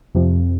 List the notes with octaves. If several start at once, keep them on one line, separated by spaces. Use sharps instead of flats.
F2 C3 F3